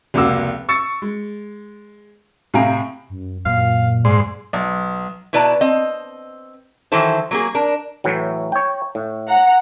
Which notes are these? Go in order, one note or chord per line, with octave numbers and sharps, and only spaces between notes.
F1 C#2 A#3 F#4 D6 E6
C#6 E6 A6 C#7
G#3
A2 C3 F5 G#5 A#5 D7
F#2
F#2 A#2 F5
G#2 D5 C6
B1
B2 E4 B4 D5 A5 A#5
C4 D#5
D#3 E3 F#3 E4 A4 C5
F#3 A#3 G#4
D4 A#4
A2 E3 F#3
C#5 G5
A2
F#5 A#5